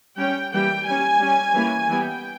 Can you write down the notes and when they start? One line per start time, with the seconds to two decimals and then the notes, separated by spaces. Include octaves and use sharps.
0.17 G3 C#4 G5
0.51 E3 G3 A#3 G5
0.85 G3 C#4 G#5
1.20 G3 C#4
1.54 E3 G3 A#3 C#4
1.88 E3 G3 B3 G5